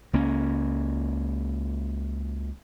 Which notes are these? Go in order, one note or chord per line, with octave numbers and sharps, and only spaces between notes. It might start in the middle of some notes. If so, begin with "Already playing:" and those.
C#2 A#3 C#4